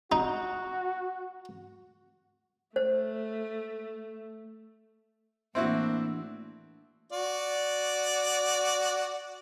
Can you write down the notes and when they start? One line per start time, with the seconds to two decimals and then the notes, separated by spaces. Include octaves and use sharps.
0.12 D#4 F#4
2.76 A3 C5
5.55 A2 E3 A#3 C4 D4 E4 F#4
7.12 F#4 D5